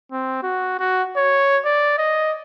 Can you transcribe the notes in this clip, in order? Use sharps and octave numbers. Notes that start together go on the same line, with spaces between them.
C4
F#4
F#4
C#5
D5
D#5